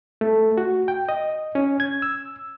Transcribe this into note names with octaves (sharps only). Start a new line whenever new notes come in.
A3
F#4
G5
D#5
C#4
G#6
E6